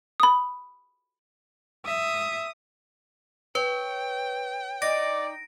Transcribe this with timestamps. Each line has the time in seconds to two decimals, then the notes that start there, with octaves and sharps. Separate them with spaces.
0.20 B5 D#6
1.85 E5 D#6
3.55 B4 C#5 G5
4.82 D#4 D5 A#6 D7